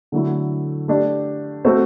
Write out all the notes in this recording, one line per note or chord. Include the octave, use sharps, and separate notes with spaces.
D3 F#3 A3 E4
A3 D4 G4
A3 C4 F#4 C5